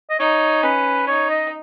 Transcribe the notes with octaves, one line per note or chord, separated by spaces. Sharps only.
D#5
D#4 C#5
C#4 B4
D#4 C#5
D#5